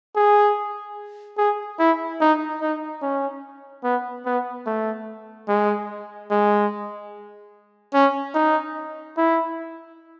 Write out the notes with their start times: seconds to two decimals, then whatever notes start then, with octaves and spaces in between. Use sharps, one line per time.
0.16 G#4
1.38 G#4
1.79 E4
2.21 D#4
2.61 D#4
3.02 C#4
3.84 B3
4.26 B3
4.66 A3
5.48 G#3
6.30 G#3
7.94 C#4
8.34 D#4
9.17 E4